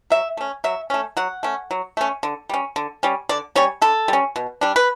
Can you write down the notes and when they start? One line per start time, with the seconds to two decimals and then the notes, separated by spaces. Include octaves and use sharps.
0.10 F#3 E5
0.37 A3 C#4
0.64 F#3 E5
0.90 A3 C#4
1.17 F#3 F#5
1.43 A3 C#4
1.71 F#3
1.97 A3 C#4
2.23 D3
2.49 G3 C#4
2.76 D3
3.03 G3 C#4
3.29 D3 D5
3.55 G3 C#4 C#5
3.82 D3 A4
4.08 G3 C#4
4.36 B2
4.61 G3 D4
4.76 B4